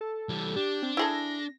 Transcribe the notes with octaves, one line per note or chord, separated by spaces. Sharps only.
A4
E3 G3
D4 G4
C4
E4 G#4 A4 A#6